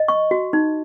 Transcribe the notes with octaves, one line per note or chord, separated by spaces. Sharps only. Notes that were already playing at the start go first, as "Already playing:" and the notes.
Already playing: D#5
C#6
F#4
D#4